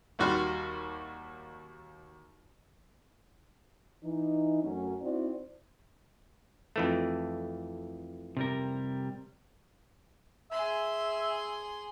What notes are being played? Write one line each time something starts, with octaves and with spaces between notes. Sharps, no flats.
D#2 G3 F#4 C6 F6
E3 D#4
F#2 F#3 A3 C#4
C4 D#4 E4 F#4 C5 D5
F2 E3 A3
C3 G3 A#4
G#4 E5 C6